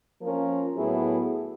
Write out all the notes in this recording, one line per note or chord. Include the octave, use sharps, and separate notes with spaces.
F3 A#3 C#4 F4 A#4
A2 F#3 B3 E4 G#4